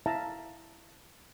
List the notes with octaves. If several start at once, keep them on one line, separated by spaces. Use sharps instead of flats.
E4 E5 F5 A5 A#5